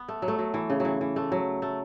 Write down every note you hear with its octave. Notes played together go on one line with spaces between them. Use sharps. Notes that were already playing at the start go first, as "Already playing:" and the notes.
Already playing: B3
A3
F#3
A3
F#3
E3
C#3
E3 F#3
E3
A3
F#3
A3